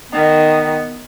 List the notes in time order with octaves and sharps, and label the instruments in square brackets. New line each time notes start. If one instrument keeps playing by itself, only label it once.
[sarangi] D#3 [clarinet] B3